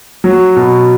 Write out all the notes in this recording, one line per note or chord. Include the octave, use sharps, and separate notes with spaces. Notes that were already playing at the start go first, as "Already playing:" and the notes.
F#3
B2